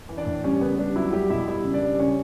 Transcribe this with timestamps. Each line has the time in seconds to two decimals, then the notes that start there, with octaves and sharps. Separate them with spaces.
0.09 E3
0.17 D4 D5
0.26 A2
0.44 G3 C#4 C#5
0.61 C#3 B3 B4
0.79 G3 D4
0.96 F#3 E4
1.13 F#3 G3 G4
1.30 B2 E4 E5
1.48 G3 E4 E5
1.64 C#3
1.73 D4 D5
1.82 G3
1.95 D5
1.99 C#3 C#4 C#5